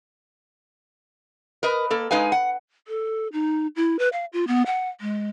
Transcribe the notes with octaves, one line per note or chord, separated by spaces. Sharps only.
A#4 B4 D#5
A#3 A4
G#3 D#4 B4 F5 G#5
F#5
A4
D#4
E4
B4
F5
F4
B3
F#5
G#3